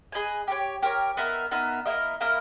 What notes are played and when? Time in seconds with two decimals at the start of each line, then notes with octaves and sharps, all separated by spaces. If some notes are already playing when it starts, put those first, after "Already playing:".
0.12 G#4 B4 D#5 G#5
0.48 G4 A#4 C#5
0.82 G4 A#4 C#5
1.17 B3 D#4 A#4 E5
1.51 B3 D#4 A#4 E5
1.86 A#3 E4 A#4 D#5
2.20 A#3 E4 A#4 D#5